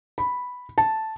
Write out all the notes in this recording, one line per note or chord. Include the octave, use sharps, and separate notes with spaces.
B5
A5